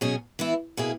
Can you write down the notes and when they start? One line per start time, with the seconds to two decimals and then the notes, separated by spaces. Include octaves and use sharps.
0.01 B2 F#3 C#4 G#4
0.39 E3 B3 E4
0.77 B2 A#3 E4 G#4